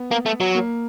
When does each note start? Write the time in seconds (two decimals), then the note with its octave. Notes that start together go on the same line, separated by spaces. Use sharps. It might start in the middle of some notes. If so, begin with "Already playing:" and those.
Already playing: B3
0.11 A#3
0.26 A3
0.40 F#3
0.55 A#3